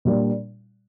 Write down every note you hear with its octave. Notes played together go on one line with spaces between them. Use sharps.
A#2 G3 D4